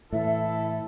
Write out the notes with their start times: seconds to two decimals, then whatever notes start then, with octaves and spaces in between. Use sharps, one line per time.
0.13 A2 E3 E4 A4 E5